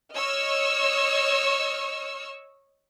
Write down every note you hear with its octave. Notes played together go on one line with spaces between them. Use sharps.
C#5 D#5 C#6 E6 F6